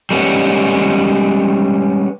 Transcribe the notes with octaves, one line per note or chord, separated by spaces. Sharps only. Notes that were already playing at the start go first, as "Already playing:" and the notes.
G3 G#3 B3 C#4